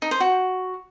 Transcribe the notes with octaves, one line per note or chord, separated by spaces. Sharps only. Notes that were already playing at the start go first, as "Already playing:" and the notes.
D#4
C5
F#4